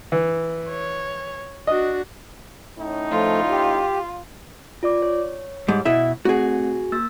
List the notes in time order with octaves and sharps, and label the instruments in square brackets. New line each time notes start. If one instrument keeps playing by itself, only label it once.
[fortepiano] E3
[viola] C#5
[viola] D4 F#4 [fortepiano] D#5
[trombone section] A2 C#4 D#4
[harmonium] F3 A3 [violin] F4
[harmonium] G4
[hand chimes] F4 D5 D6
C#5
[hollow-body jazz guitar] G#2 G3
B2 E4 E5
[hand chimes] A3 C4 [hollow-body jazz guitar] F#4 G#4
[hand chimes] A#3 E6 A6